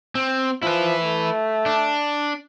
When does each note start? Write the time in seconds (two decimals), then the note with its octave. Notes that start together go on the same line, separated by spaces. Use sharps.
0.15 C4
0.63 F3 E4 B4
1.03 A3
1.66 D4